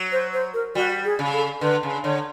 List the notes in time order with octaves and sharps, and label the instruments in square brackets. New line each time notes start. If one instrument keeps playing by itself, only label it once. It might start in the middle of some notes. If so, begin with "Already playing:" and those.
Already playing: [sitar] F#3
[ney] C5
C5
A#4
[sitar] G3 [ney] F#4
[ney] G#4
[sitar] C#3
[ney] A4
[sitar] D3 [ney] B4
[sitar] C#3
[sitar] D3 [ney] C#5